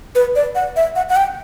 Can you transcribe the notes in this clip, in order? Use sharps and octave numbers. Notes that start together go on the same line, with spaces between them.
B4
D5
F#5
E5
F#5
F#5
G5